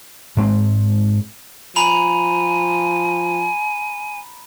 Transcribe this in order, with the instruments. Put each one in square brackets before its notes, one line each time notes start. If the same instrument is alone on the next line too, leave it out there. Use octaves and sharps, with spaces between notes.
[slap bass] G#2 G#3 A3 C4
[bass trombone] F3 [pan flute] G#5 [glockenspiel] A#5 B5 F7